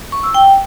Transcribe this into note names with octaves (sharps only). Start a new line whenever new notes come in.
C#6
E6
G5